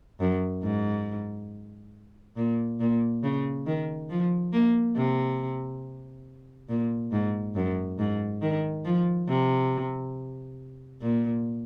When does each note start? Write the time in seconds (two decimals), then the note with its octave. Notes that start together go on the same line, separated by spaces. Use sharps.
0.20 F#2
0.63 G#2
2.36 A#2
2.80 A#2
3.23 C#3
3.66 D#3
4.10 F3
4.53 A#3
4.96 C3
6.69 A#2
7.12 G#2
7.56 F#2
7.99 G#2
8.42 D#3
8.85 F3
9.28 C3
11.02 A#2